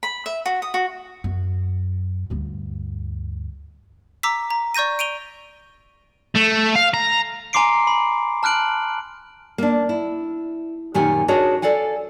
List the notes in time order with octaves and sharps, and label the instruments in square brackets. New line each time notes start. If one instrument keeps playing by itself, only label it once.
[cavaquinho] B5
E5
F#4
D#6
F#4
[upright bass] F#2
D2 G2
[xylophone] A#5 D6 E6 B6
A#5
D5 C#6 G6 A#6 D#7
D7 D#7 F7 G7
[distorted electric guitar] A3
F5
A#5
[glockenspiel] G#5 A#5 C6 D6 C7 D7
B5
A5 F6 F#6 D7 F#7
[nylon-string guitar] A#3 D4
E4
F#2 A#2 D#3 G4 F#5 G#5
D4 F#4 G#4 A#4 C#5 D#5
A4 D5 F5 F#5 G#5